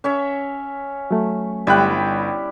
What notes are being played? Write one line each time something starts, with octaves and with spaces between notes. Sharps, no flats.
C#4 C#5 E5
F#3 A3
G1 G3 E4 G5 F#6